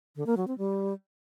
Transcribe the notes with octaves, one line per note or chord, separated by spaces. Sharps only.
D3
A#3
F#3
C4
G3